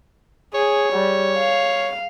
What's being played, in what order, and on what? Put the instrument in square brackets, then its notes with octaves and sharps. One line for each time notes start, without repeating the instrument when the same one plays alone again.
[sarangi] G#4 [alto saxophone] C#5
[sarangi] G3
F5